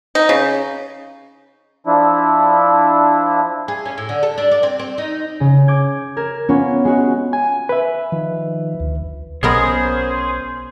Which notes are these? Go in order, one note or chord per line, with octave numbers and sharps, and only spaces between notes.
D#4
C#3
F3 D4 E4
G#4
C#4
A2
D3
A4
D4
D5
C4
C4
D#4
C#3
D6 G6 G#6
A#4 G#6 E7
B3 C#4 F4
G#3 F#4
G#5
B4 E5
D#3 F3
D2
B1 G#3 B3 C#4 G#4 A#4 C5